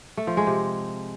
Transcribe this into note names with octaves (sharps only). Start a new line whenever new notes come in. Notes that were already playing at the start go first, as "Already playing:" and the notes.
A3
F3
G#3
C3